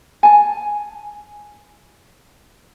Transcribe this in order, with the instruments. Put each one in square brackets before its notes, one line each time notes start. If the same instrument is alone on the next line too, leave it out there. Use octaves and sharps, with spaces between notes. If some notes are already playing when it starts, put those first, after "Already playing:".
[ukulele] G#5 A5